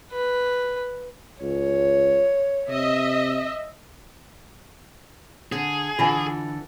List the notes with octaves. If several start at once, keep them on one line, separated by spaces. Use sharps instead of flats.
B4
C#2 C#5
C3 D#5 E5
D3 G#4
D3 E3 F4 G#5